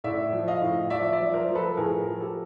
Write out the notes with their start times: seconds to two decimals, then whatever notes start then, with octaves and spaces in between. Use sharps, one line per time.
0.04 A2 D5 E5
0.33 F3
0.48 D#5 F5
0.61 A2
0.90 F3 D5 E5
1.13 D5 E5
1.20 F3
1.34 A#4 C5
1.48 F3
1.55 A4 B4
1.77 A2 G#4 A#4
2.06 F3
2.21 G4 A4